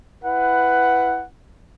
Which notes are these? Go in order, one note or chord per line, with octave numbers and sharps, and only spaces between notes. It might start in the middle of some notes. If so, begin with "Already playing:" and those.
E4 B4 F#5